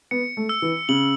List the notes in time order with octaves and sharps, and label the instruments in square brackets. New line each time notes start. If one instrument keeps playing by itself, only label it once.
[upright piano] B3 [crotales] C#7
[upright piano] A3
[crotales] E6
[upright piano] E3
[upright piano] C#3 [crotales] F#7